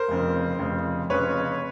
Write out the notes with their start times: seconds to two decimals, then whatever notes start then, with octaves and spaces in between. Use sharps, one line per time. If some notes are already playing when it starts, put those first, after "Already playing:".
Already playing: A#4 C5
0.08 F1 F2 C#3
0.59 F1 F2 C#3
1.09 F1 F2 C#3 B4 C#5